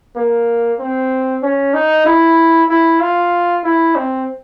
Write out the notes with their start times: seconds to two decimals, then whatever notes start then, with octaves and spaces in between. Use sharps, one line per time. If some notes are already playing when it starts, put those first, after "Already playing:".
0.16 A#3
0.79 C4
1.43 C#4
1.74 D#4
2.06 E4
2.69 E4
3.00 F4
3.64 E4
3.95 C4